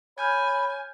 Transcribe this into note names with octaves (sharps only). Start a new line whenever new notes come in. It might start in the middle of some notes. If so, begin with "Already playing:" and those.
C#5 G#5 B5 F6 G6 G#6